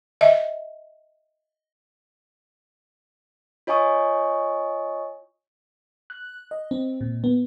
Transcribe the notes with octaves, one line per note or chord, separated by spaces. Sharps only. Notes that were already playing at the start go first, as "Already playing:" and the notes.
D#5 E5
F4 C#5 D#5 G#5 C#6 D#6
F#6
D#5
C4
A#2
B3